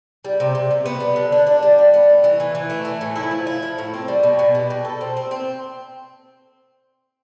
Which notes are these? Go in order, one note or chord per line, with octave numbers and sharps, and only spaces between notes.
G3
C3
C3
C3
B3
G3
D3
D4
D4
G3
D4
B3
A3
E3
E3
E3
A3
E3
A2
E4
F3
E4
F3
A2
C4
G3
B2
B2
G3
B2
A4
C4
C4
C4